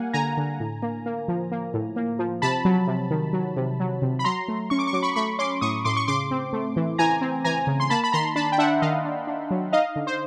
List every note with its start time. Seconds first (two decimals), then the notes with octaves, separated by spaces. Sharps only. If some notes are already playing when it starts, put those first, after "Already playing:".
Already playing: G3 A#3 F5 F#5 G#5
0.13 D3 G#5 A#5
0.37 D3
0.60 A2
0.83 A#3
1.06 A#3
1.28 F3
1.52 A#3
1.74 A2
1.96 A#3
2.19 F3
2.42 C3 A5 B5
2.65 F#3
2.87 C3
3.11 D#3
3.33 F#3
3.57 C3
3.80 F#3
4.02 C3
4.19 B5
4.24 F#3 A#5 C6
4.48 A3
4.70 C#4 C#6
4.79 D6
4.87 C#6
4.93 F#3 D6
5.03 B5 C#6
5.16 A3 B5 C#6
5.39 C#4 C6 D6
5.61 A2 C#6 D#6
5.85 A2 C6 D6
5.97 C#6
6.08 C#3 C6 D6
6.31 C4
6.53 A3
6.76 E3
6.98 E3 G#5 A#5
7.21 C4
7.45 E3 G#5 A#5
7.67 C#3
7.80 C6
7.90 A#3 A5 B5
8.04 B5
8.12 D#3 A#5 C6
8.36 D4 A5 B5
8.52 G5
8.58 D4 E5 F#5
8.82 D#3 D#5 F5
9.05 D4
9.27 D4
9.51 F#3
9.73 D#4 D#5 F5
9.96 D3
10.07 C5